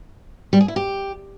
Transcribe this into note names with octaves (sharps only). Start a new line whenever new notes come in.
G3
G#4
E4
G4